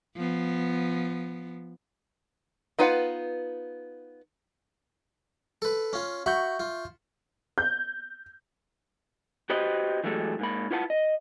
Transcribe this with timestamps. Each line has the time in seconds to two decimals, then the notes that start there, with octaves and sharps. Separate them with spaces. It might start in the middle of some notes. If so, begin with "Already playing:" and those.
0.16 F3 B3
2.79 B3 D#4 F4 B4 F#5
5.62 A4 B4
5.93 C#4 F4
6.26 F#4 E5 B5 C#6 G6
6.60 F4
7.58 G6
9.50 F#4 G4 B4 C5 D#5
10.04 E3 F#3 G#3 A3 G4 A4
10.39 G#2 A#3 B5
10.71 E4 F4 B4 F#5 G#5 A5
10.90 D#5